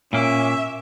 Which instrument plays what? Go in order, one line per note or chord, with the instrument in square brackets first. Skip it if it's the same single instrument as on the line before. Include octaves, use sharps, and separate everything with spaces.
[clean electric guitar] A#2 A#3 [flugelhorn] C#4 [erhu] E5